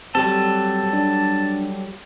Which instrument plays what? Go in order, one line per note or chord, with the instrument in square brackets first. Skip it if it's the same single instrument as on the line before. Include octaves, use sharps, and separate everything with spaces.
[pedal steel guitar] F#3 G3 A4 [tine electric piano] C4 G4 [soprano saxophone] A5
[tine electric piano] D4